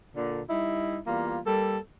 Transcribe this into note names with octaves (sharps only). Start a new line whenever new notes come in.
A#2 D3
G3 D#4 E4
E2 G3 A#3 F4
G3 A#3 A4